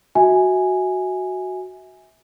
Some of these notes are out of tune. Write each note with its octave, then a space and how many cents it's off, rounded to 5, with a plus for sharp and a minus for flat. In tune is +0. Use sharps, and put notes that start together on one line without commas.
F#4 +0 E5 -25 G#5 +0